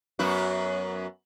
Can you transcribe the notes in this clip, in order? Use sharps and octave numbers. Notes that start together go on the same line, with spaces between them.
F#2 B3 F#4